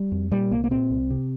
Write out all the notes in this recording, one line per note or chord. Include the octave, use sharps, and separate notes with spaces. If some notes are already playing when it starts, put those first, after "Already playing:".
Already playing: G3
F2
A#2 G3
C2 A#3
A#3
A#2 C4
C2
C3